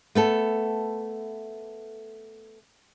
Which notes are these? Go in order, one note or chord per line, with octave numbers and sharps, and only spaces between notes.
A3 B3 A4